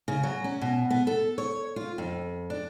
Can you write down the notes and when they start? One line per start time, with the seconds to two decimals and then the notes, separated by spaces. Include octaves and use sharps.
0.08 C#3
0.23 F#3
0.44 C#4
0.62 B2
0.90 B3
1.07 A4
1.38 C#5
1.76 F4
1.98 F2
2.50 D4